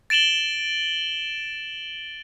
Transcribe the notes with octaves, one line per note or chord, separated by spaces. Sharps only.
A6 D7 E7 F#7 G7